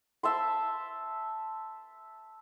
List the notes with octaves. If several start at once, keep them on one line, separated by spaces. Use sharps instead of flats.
E5 A5 C6